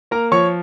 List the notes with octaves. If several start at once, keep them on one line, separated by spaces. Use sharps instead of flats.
A#3 A#4 A#5
F3 C#5 C#6